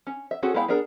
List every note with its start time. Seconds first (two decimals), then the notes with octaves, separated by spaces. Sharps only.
0.07 C#4
0.31 E5
0.43 C4 C#4 F#4 G#4 A4
0.54 G#3 B3 E4 F5 G5
0.68 B3 D4 G#4 A#4